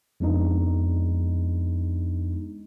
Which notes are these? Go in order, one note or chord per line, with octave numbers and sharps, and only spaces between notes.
F2 G#3 B3 D4 D#4